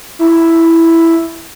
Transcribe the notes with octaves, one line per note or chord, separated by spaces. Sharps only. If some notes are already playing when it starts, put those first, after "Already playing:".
E4